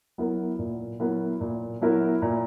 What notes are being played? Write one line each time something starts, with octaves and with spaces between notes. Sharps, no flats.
F#3 B3 E4 A#4
A#2
F#3 B3 E4 A#4
A#2
F#3 B3 E4 A#4
A#2